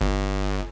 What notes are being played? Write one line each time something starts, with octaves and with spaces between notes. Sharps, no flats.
G1